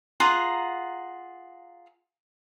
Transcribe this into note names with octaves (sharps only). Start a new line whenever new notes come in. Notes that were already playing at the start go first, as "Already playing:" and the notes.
F4 G#4 F#5 A#5